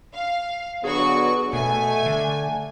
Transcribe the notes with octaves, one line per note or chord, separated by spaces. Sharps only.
F5
D3 F#3 B3 F#4 G#4 C#6
B2 A3 G#5
D3